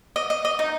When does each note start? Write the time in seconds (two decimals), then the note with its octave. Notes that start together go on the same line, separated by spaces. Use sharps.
0.16 D#5
0.30 D#5
0.45 D#5
0.59 D#4